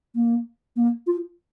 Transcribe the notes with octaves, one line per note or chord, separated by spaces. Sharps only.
A#3
A#3
F4